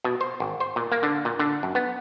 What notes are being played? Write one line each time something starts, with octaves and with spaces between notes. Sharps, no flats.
B2
C5
G#1
C5
A#2
A#3
D3
A#2
D3
F#2
B3